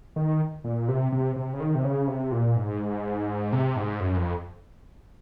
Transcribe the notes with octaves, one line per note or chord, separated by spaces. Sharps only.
D#3
A#2
C3
C3
C3
C#3
D#3
C3
C#3
C3
A#2
G#2
C3
G#2
F#2
F2